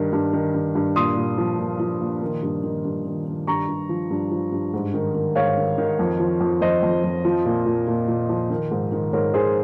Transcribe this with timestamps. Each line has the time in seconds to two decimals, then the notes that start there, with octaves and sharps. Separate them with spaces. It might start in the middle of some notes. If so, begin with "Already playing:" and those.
Already playing: G2 D#3
0.13 G2
0.33 D#3
0.54 G2
0.75 G2
0.96 A#2 C6 D#6
1.17 A#2
1.38 F3
1.59 A#2
1.80 F3
2.01 A#2
2.22 D#3
2.43 G2
2.64 D#3
2.85 G2
3.05 D#3
3.27 D#3
3.47 G2 A#5 C#6
3.68 G2
3.89 F3
4.10 G2
4.31 F3
4.52 G2
4.74 G#2
4.94 D#3
5.15 D#3
5.36 G#2 C#5 F5
5.57 D#3
5.78 D#3
5.99 F2
6.19 F3
6.41 F2
6.61 F2 C5 D#5
6.83 F2
7.04 F2
7.25 F3
7.45 A#2
7.66 A#2
7.87 A#2
8.08 A#2
8.29 F3
8.50 D#3
8.71 G#2
8.92 D#3
9.13 G#2 A#4 C#5
9.34 D#3 G#4 C5